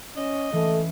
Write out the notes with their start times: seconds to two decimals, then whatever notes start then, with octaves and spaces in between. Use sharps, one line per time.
0.17 C#4 D#5 D6 A#6 E7
0.53 E3 G#3 A3 C#4 A4